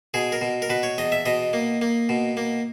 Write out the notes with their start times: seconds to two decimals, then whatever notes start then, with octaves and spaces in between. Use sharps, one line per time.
0.14 B2 G#4
0.32 A#4
0.41 B2
0.62 A#4
0.69 B2 B4
0.83 C#5
0.98 E2 D#5
1.12 E5
1.26 B2 D#5
1.53 A#3
1.81 A#3
2.09 B2
2.37 A#3